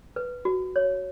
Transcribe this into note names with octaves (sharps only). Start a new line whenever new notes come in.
B4
F#4
C#5